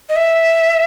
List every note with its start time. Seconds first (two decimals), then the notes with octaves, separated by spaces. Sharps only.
0.09 D#5
0.16 E5